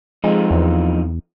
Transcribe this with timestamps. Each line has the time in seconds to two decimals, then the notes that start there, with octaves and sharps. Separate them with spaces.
0.24 F2 F3 G#3 D#4
0.51 E2